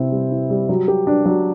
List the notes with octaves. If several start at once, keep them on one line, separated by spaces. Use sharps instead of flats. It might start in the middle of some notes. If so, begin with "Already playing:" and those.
Already playing: C3 C4 E4
G3
E4
G3
F#3
G4
D4
F#3